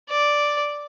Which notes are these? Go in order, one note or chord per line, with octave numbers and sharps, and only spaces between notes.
D5